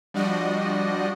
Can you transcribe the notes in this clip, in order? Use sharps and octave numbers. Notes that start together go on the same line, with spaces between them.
F3 G3 D4 F#4 D5 D#5